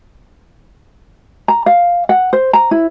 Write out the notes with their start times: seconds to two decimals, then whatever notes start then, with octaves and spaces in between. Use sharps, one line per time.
1.48 A#5
1.66 F5
2.09 F#5
2.33 C5
2.53 A#5
2.71 E4